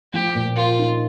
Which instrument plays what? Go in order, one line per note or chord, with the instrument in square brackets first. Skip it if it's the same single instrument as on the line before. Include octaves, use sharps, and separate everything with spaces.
[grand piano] F3 [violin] G4
[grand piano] A#2
[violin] F4 [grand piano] A#4
[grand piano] D#4